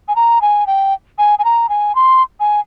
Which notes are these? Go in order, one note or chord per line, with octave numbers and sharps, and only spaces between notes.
G#5
A#5
G#5
G5
G#5
G#5
A#5
G#5
C6
G#5